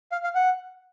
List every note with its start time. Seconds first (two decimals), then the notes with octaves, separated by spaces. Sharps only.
0.12 F5
0.24 F5
0.35 F#5